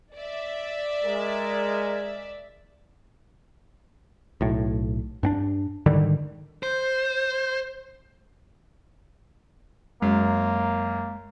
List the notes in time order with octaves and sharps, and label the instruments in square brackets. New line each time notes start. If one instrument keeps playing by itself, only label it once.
[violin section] D5 E5
[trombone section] G#3 A#4
[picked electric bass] B1 A2
G2 C4 D4
G#2 D3 D#3 G3
[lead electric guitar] C5 [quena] G6
[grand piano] F#2 [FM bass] G#3 [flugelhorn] A#3